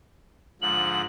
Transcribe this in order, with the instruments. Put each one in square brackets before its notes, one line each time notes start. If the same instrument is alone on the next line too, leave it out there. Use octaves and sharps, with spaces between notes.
[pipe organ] G#2 D3 F3 [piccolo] F#7